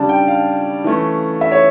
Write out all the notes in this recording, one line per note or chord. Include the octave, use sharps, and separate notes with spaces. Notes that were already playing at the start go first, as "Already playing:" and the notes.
Already playing: C#3 G3 D4 A5
G5
F5
E3 A3 C#4
E5
C#5